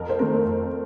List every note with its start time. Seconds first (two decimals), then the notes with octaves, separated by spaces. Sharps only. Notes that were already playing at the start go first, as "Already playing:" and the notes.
Already playing: F2 A#4
0.09 C5
0.19 D#3 A3 C4 A#4
0.45 F2